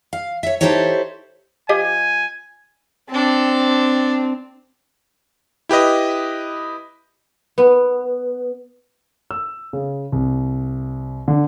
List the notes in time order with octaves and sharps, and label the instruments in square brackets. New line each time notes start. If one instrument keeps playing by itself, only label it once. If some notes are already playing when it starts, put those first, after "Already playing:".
[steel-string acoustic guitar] F5
C#5 E5
D#4 E4 G4 A4 C5 C#5
[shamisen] F3 G4 D#5 [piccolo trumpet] G#5
[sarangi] C4 [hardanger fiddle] D4 A4
[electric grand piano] E4 G4 B4 D#5
[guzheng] B3
[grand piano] E6
C#3
C2
D3